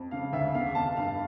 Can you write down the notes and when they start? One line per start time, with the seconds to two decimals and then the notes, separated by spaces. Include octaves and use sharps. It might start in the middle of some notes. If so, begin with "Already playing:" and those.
Already playing: F2
0.11 C#3 F5
0.33 D2 E5
0.54 E2 F5
0.75 F1 A5
0.97 G2 F5